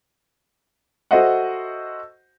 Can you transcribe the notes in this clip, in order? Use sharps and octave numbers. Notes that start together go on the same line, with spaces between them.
F#4 A4 C5 D#5 E5 F#5